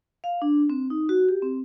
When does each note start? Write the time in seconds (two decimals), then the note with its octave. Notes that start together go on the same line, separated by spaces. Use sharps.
0.24 F5
0.42 D4
0.70 C4
0.90 D#4
1.09 F#4
1.29 G4
1.42 C4